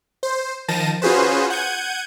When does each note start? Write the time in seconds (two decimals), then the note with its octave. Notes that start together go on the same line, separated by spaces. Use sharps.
0.23 C5
0.68 D#3 F3 A5 A#6 D#7
1.02 C#4 F4 F#4 G#4 B4 C5
1.50 F#5 G6 G#6 D#7